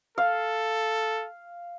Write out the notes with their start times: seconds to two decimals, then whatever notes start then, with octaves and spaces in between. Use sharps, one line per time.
0.18 A4 F5